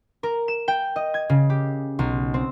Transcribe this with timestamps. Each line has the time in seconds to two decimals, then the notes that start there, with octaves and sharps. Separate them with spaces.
0.23 A#4
0.48 E7
0.68 G5
0.96 D#5
1.14 G#6
1.29 C#3
1.50 G4
1.99 B1
2.34 C4